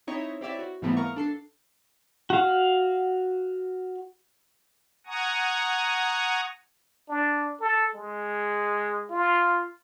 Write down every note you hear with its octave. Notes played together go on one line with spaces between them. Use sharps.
C4 D#4 E4 C#5 D#5 E5
C4 E4 G4 C#5 D5 E5
F#4
G#2 E3 G3 A3 B3 C4
A#4 D#5 F5 A#5 C#6
D4 A4 C7
F#4 F5
F#5 G#5 A#5 C#6 D#6
D4
A4
G#3
F4